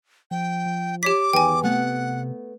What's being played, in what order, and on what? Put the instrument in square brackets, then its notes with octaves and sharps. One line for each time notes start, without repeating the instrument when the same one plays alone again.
[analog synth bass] F3 [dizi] G5
[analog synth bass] F3
[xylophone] G4 C#5 B6 [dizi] D6
[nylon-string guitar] E2 [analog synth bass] D#3 [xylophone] G5 G#5
[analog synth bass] C3 [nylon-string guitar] A3 B3 [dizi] F#5